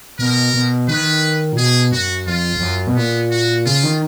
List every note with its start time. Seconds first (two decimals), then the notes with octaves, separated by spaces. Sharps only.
0.19 B2 A#4
0.54 B2
0.88 D#3 B4
1.53 A#2
1.57 B2 G#4
1.92 F#2 F#4
2.27 F2 F4
2.56 F2
2.62 F#2
2.87 B2
2.96 A#2 B3
3.31 F#4
3.66 C#3 F4
3.83 D#3